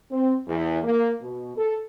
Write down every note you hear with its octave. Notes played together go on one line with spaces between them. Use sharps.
C4
E2
A#3
B2
A4